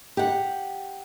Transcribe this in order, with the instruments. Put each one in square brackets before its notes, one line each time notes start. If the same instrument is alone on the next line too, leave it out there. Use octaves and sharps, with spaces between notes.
[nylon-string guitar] G4 F#5